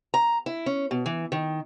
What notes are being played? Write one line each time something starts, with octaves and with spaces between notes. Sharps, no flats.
A#5
E4
C#4
B2
E3
D#3